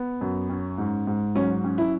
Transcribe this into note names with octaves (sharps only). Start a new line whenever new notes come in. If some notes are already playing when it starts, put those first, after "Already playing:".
Already playing: B3
F#2
C#4
G#2
G#2
F#3 C#4
C#4
E4